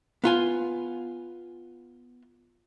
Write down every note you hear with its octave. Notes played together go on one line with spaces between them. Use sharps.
B3 F4 G#5